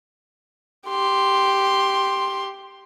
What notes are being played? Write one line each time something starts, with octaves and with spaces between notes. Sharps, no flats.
G4 C6